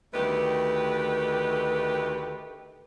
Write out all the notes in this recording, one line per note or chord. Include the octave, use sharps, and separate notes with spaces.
D2 D#3 A3 G4 B4